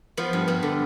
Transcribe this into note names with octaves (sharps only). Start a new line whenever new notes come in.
F3 B3
G2
G2 B3
D3